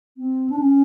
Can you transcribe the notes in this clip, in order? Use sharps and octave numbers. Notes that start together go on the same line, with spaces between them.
C4
D4
C#4